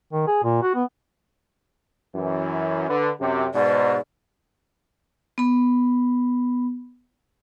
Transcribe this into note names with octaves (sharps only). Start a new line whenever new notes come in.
D#3
G#4
A#2
F#4
B3
F#2 E3
D3 B4
F#2 C3
G#2 B2 D5
B3 B5